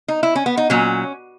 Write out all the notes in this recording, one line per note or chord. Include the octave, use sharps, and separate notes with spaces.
D#4
E4
C#4
B3
D#4
A#2 F#3 C#4